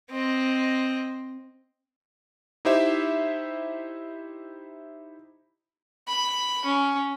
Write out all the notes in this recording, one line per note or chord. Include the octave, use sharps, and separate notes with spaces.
C4 D#5
D#4 E4 G4 C5 E5
B5
C#4